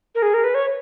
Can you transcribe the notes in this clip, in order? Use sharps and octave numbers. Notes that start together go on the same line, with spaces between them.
A#4
G#4
A#4
B4
C#5